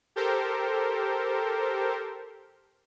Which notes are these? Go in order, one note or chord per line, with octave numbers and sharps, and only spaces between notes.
G4 A4 A#4 C5